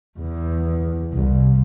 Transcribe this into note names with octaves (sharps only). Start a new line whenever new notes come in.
E2
C2